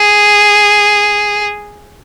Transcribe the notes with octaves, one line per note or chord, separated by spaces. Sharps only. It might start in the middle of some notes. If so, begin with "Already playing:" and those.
Already playing: G#4